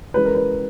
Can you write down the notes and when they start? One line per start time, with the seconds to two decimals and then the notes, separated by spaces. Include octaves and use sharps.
0.14 E3 G#3 C#4 B4
0.25 A#4
0.35 B4